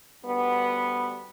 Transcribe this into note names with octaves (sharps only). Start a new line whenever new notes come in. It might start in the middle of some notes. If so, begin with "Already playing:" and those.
D2 G3 B3